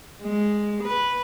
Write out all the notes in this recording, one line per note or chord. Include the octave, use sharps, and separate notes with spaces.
G#3
B4